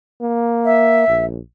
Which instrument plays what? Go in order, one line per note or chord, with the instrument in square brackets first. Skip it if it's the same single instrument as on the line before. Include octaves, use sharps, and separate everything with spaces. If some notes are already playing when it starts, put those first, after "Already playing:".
[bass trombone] A#3
[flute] E5
[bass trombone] A#1